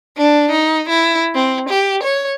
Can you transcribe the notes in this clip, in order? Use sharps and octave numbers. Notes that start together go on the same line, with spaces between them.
D4
D#4
E4
C4
G4
C#5